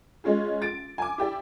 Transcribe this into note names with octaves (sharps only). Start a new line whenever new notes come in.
G#3 C#4 F4 G#4
A6 D7
G#5 D6
E4 G4 D5